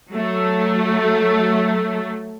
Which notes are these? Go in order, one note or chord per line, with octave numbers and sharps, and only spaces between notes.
F#3 A3